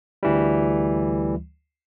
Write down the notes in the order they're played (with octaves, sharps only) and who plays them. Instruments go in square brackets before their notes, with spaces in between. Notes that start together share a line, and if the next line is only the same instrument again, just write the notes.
[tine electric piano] D2 E3 G3